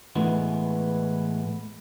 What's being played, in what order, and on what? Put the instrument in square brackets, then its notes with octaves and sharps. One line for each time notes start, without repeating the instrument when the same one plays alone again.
[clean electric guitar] A2 E3 G#3 B3